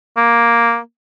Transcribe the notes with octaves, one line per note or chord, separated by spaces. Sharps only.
A#3